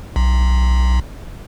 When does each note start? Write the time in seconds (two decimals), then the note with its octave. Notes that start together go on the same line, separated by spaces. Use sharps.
0.16 B1